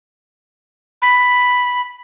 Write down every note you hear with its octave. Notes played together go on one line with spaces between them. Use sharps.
B5